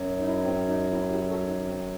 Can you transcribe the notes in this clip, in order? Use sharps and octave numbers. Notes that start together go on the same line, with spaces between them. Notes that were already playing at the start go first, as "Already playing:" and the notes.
Already playing: F#2 F#3
D#4
E4
D#4
C4
D#4
C4 E4
E4 G4
F#4 A4
D#4
C4